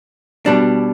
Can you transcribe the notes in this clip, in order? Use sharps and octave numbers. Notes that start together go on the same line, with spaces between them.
B2 G3 D4